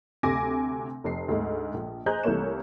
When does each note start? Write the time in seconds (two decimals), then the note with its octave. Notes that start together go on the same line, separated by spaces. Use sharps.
0.23 D2 C3 G#5 D6 A#6
1.04 F1 C7
1.28 D2 G#2
1.74 A#1
2.06 G#4 C5 D#5 A#5 F#6 G6
2.23 C2 E3 A3 A#3 C#5 E7